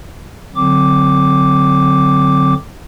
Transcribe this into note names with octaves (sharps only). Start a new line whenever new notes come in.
D3 F#3 C4 D6